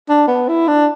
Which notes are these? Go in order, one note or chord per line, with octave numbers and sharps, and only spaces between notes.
D4
B3
E4
D4